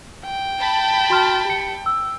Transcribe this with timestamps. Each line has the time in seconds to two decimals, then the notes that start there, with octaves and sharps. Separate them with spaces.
0.24 G5
0.59 A5 B5
1.10 F#4 C6 F6
1.45 G4 C#7
1.86 E6